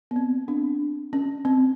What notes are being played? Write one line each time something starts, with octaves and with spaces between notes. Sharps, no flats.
B3
C4
C4 D4
C#4
C4